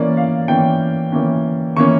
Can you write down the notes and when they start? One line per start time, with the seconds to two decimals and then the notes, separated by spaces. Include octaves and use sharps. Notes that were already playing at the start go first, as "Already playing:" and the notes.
Already playing: E3 A#3 C#4 D5
0.17 F5
0.48 E3 A#3 C#4 G5
1.12 E3 A#3 C#4
1.76 E3 A#3 C#4 C#6